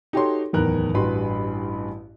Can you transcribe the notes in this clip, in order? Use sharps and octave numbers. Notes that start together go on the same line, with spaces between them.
D#4 F#4 G4 A4 C#5 C6
D1 E2 D#3 A#4 B4 F#6
A1 G2 F#4 B4 B5 C6